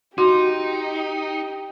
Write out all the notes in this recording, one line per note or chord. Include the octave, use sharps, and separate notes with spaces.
D#4 F#4 G4 C6